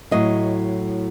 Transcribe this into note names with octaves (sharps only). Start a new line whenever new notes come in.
A2 F#3 D#5